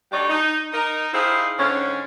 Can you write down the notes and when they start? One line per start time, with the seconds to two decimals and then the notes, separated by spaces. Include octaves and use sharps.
0.12 D2 G3 D#4 C#5 D5
0.29 D#4
0.72 D#4 A#4
1.13 D#4 E4 G4 G#4 C5 F5
1.59 G#2 D3 C4 C#4